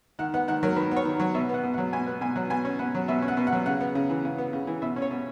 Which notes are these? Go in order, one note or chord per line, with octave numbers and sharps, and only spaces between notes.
D#3 F#5
B3 F#5
D#3 F#5
F#3 A#4
D#3 B4
B3
C#5
D#3
F#3
B2 E5
B3
F#5
B2
F#5
F#3
B2 G#5
B3 F#5
B2 G#5
F#3 F#5
B2 G#5
C#4
B2 F#5
F#3
B2 E5
C#4
F#5
B2
F#5
F#3
C#3 F#5
B3
C#3
E3
C#3
B3
C#3
E3
B2 E5
C#4
C#5
B2